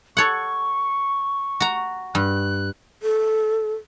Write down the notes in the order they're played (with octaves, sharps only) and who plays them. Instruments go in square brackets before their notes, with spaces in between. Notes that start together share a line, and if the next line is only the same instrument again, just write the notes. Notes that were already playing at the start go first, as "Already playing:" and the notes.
[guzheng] A4 C#5 F#5 [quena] C#6
[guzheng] F#4 A#5
[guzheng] G2 [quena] F#6
[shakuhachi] A4